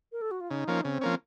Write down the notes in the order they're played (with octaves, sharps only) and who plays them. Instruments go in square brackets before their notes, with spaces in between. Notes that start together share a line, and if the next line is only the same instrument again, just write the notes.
[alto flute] A#4
A4
F#4
F4
[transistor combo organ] C#3 [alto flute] D#4
[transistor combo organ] F3 A#3 C#4
[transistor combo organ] C#3 [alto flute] C4
[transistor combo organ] F3 A#3 C#4